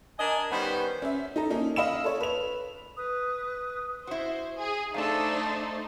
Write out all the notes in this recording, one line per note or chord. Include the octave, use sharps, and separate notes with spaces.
D4 A#4 D#5 G#5
D#3 G3 B3 C#4 B4 C5
C#4 E5
D#4 A4 A#5
A#3 C#4 D#4
D#5 F5 B5 E6 E7
A4 C#5
B4 F7
B4 D#6
E4 F#4 C5
G#4
A3 D4 D#4 A4 C5 F5 A5